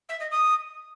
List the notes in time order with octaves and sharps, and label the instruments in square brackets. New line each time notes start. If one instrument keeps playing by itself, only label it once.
[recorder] E5
D#5
D#6